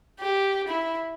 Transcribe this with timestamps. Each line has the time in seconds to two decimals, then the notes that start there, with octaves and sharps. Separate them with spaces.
0.19 G4
0.68 E4